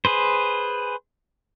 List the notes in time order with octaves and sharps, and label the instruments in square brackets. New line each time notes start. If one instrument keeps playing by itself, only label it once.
[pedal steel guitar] G#4 B4 C5